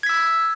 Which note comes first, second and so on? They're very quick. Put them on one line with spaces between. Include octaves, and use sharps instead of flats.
G#6 B6 E6